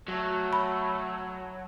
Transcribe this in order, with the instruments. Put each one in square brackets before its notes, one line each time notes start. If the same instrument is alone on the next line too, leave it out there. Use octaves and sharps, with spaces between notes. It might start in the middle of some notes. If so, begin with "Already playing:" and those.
[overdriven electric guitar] F#3 [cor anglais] A3
[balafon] B5